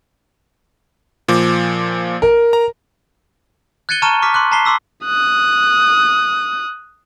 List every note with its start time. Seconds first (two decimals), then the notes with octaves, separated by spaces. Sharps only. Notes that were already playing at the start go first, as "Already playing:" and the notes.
1.28 A#2 F3 D6
2.22 A#4
2.53 A#5
3.89 F#6 G#6 A6 C#7 D#7 G7
4.02 A5 A#5 C#6 F6 D#7
4.22 C#6 D6 F6 B6
4.34 C6 D6 F#6
4.51 A5 A#5 B6 C7 G7
4.65 C6 D6 E6 B6
5.05 D#6 F#6